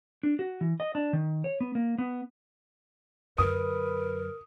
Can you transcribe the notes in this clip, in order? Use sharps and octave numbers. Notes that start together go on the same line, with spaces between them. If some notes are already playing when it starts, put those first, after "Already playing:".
D4
F#4
E3
D#5
D4
D#3
C#5
B3
A#3
B3
F#2 D3 A#4 B4 D#6